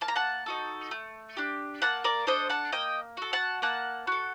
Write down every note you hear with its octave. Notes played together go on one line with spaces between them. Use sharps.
A#3 A5
A#5
F#5 A5
D#4 F#4 A4
A3
D4 G4
A#3 F#5 A5
A#4 D5
D4 A4 C5 D#5
F#5 A5
A#3 D#5 G5
F#4 A4
F#5 A5
A#3 F#5 A5
F#4 A4